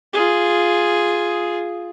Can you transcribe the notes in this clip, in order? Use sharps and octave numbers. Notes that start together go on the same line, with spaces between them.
F4 G#4